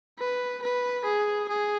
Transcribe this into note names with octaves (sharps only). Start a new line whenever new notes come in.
B4
B4
G#4
G#4